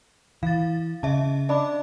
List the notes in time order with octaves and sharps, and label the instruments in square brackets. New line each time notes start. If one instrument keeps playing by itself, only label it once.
[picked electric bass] E3 [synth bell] F5 A6
[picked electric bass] C#3 [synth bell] D#5 E5 A5
[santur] D4 [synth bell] D#5 B5 D6